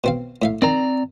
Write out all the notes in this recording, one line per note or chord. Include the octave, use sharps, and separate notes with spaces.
B2 C4 F5
A2 E5 F5
D#3 C4 D5 A#5